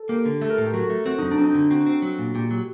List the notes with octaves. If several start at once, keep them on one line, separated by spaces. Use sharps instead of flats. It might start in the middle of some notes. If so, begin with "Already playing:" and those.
Already playing: A4
A#3 G4
D3
A3 A4
A#4
A2 A4
G4
F#3 F#4
A3
C4 F#4
F#2 D#4
D4
C4
D#4
D3
C4 F#4
C4
F#3
A#2
A#2 G4
F#3